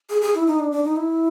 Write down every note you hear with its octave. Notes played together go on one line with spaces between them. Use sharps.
G#4
G#4
E4
D#4
D4
D4
D#4
E4